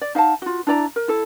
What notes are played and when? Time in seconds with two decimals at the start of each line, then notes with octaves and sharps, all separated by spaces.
0.01 D5
0.15 D#4 F5 F#5 A5
0.42 F4 F#4
0.67 D4 E4 D5 A#5
0.96 A#4
1.08 E4 A4